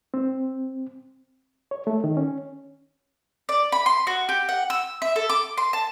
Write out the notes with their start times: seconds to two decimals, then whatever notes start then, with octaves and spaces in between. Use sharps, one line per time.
0.14 C4
1.71 C#5
1.87 A3
2.04 D#3
2.17 C#4
3.49 D5
3.72 B5
3.86 C6
4.07 F#4
4.29 G4
4.49 F#5
4.70 E6
5.02 E5
5.16 A4
5.29 D6
5.58 C6
5.73 A5